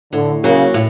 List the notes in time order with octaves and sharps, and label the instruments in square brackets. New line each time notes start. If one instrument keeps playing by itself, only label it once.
[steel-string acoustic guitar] A2 [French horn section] D3
[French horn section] C#3 [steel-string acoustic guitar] F#3 A#3
[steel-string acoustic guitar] A2